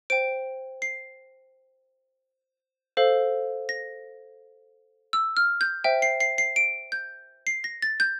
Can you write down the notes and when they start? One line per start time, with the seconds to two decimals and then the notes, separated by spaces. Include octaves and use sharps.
0.10 C5 G5 D7
0.82 C7
2.97 A4 C5 F5
3.69 A#6
5.13 E6
5.37 F6
5.61 G6
5.84 C5 E5 G5
6.02 C7
6.20 C7
6.38 C7
6.56 D7
6.92 G6
7.47 C7
7.64 A#6
7.82 A6
8.00 G6